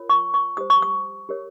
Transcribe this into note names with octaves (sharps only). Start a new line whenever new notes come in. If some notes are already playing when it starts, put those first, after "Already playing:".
Already playing: F4 A#4 C#5
C#6
C#6
G4 C5 D#6
C#6
D#6
G4 A#4 C#5